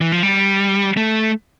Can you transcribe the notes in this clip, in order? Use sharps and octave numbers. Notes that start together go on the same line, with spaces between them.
E3
F3
G3
A3